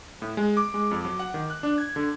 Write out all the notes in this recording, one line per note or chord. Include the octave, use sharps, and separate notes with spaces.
A2
G#3
D6
G#3
F2
F#3
F#5
D#3
F#6
D4
G#6
D3